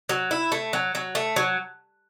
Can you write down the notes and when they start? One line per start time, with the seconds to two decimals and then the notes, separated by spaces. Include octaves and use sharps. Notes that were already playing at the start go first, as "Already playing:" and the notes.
0.09 F#3
0.31 E4
0.52 A3
0.73 F#3
0.95 F#3
1.15 A3
1.36 F#3